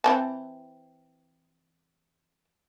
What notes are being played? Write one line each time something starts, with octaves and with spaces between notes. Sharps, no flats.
E3 C4 A5